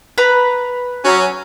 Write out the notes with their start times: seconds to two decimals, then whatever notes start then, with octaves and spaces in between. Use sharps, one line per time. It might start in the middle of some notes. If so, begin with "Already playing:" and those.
0.18 B4 A#5 B5
1.04 F#3 C#4